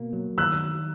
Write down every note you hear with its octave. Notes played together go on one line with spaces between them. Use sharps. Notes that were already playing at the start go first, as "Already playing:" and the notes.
Already playing: B2 A#3
F#3
D#3 E6 F#6